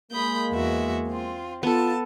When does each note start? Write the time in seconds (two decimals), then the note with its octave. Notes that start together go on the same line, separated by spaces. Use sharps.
0.12 G#3 A#3 B5 D#6 G6
0.51 E2 F#4 E5
1.07 C4 F4
1.63 B3 F4 A4 A5